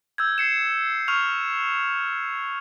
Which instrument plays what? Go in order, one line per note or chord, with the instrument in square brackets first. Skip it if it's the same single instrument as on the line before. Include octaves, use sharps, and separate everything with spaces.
[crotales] E6 G6 G#6
C7 C#7 E7
C#6 F6 F7